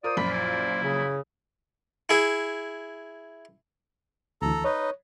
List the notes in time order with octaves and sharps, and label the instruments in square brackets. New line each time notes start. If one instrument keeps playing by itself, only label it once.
[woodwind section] F4 C5 D5 [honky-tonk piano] A#4 [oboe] D#6
[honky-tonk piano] A#1 F#2 A#2 [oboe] B5
[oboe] E4
[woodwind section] C#3
[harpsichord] E4 G#4
[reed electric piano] D2 E3 [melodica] A4 A#5
[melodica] D#4 B4 D#5 [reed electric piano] C#5